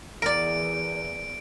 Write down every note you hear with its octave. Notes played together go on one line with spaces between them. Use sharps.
E2 A#4 D5 D7